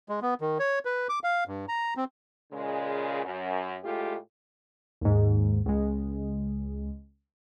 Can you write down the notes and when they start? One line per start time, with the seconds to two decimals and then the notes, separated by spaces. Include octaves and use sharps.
0.09 G#3
0.22 B3
0.41 D#3
0.59 C#5
0.85 B4
1.09 D6
1.24 F5
1.48 G2
1.68 A#5
1.96 C4
2.52 A#2 C#3 G#3
3.24 F#2
3.83 A2 G#3 A3 F4 G4
5.01 D#2 G#2
5.66 C#2 G#3